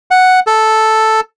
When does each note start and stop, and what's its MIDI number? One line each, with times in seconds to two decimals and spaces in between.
0.11 0.40 78
0.47 1.20 69